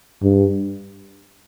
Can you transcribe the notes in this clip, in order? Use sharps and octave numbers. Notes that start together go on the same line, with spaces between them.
G2